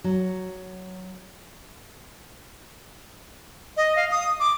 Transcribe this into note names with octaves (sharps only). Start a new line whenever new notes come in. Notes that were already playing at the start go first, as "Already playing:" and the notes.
F#3
D#5
F5
D#6
D6